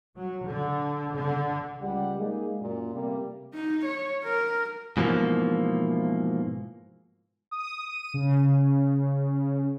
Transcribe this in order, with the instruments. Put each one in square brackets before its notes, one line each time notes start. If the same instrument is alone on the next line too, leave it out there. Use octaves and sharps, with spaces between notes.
[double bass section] F#3
D3
D3
[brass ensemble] C#2 G3 F#5
G#3 A#3 D#4 G#4
F#2 A#2
C3 G3 A3 A#3
[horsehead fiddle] D#4
C#5
A#4
[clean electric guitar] G#2 B2 E3 F3 A#3
[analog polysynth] D#6
D#7
C#3